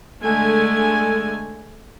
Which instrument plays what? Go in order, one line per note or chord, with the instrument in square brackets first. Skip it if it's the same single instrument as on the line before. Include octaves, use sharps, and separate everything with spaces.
[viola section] D3 G#3 A3 G#5